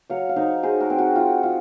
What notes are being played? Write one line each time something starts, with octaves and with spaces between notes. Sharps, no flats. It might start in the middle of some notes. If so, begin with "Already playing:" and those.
F#3 C#5 F5
F5
D#4 C5 D#5
F#3 G#4 C5
F#4 A#4
C4
F#4
F4
F4